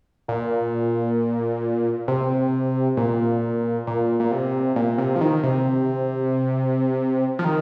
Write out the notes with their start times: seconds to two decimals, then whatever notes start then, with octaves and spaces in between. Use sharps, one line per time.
0.28 A#2
2.08 C3
2.97 A#2
3.87 A#2
4.20 A#2
4.32 C3
4.76 A#2
4.98 C3
5.15 F3
5.21 D#3
5.43 C3
7.39 F3
7.45 D#3